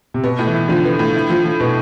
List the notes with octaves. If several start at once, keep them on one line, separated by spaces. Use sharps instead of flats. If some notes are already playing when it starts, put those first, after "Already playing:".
C3
B2 B3
A2
E3
E4
D3 F3
B3
A2
E4
F3
F3
B2 B3